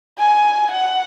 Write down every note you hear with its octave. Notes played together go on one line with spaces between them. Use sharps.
G#5
F#5